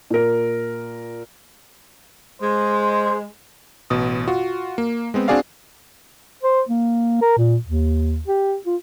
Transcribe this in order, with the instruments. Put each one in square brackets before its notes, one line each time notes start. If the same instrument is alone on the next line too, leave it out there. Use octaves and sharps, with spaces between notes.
[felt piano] A#2 A#4
[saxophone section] G#3 [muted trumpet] C5
[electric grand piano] A1 B2 D#6
F4 F#4
A#3
G#3 B3 C4
C4 D4 F#4 G#4 D5 F5
[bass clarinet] C5
A#3
A#4
A#2
D#2
G4
F4